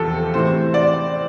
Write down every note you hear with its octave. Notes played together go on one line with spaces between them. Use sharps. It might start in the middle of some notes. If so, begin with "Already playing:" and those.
Already playing: E2 C3 F3 G4 A4
C3 E3 A3 C4 C5
D5